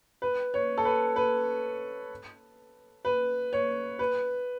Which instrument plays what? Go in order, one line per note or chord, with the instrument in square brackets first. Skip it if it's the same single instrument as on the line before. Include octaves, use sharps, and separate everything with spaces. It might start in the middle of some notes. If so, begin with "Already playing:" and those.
[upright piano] B4
C#5
A4
B4
B4
B4
C#5
B4